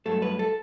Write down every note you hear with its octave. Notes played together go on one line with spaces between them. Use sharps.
G2 F#3 A3 A4
B4
A4